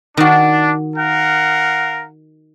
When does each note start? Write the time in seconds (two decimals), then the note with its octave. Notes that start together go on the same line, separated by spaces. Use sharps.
0.17 D#3 D4 F#4
0.96 A#4 F5 F#5